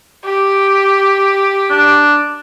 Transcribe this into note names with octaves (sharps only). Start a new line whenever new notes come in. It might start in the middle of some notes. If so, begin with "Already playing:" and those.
G4
D4